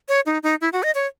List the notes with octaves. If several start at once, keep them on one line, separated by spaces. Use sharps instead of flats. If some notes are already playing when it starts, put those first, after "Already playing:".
C#5
D#4
D#4
E4
F#4
D#5
C#5